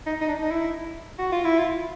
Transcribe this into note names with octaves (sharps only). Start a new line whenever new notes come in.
D#4
D#4
D4
D#4
E4
F#4
F4
E4
F4